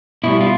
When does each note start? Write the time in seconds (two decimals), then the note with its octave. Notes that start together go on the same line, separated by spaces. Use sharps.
0.24 B2 G3 E4
0.41 F4